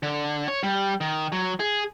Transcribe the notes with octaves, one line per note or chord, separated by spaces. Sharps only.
D3
C#5
G3
D#3
F#3
G#4